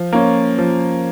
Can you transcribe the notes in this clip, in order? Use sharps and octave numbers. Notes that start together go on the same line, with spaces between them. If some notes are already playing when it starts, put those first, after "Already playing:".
Already playing: F3
A#3 C#4
F3